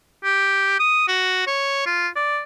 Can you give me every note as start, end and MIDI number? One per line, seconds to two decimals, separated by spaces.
0.24 0.79 67
0.80 1.05 87
1.08 1.45 66
1.47 1.85 73
1.86 2.08 65
2.16 2.42 74